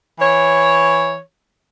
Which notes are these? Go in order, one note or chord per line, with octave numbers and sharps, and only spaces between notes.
E3 C#5